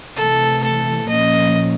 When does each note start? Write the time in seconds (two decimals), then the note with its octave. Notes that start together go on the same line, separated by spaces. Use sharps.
0.16 C3 E3 A3 A4
0.62 A4
1.08 A#2 F3 A#3 C#4 D#5